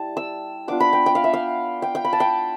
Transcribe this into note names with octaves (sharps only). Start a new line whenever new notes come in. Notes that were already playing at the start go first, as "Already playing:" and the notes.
Already playing: G3 E4 A5
E6
B3 D4 F4 D6
B5
G5
G5
F5
E5
F5
G5
G5
B5
A5
G5